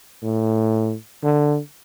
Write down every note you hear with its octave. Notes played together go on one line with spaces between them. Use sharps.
A2
D3